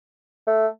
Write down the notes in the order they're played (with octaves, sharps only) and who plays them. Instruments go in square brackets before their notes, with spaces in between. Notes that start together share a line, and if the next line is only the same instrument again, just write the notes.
[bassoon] A3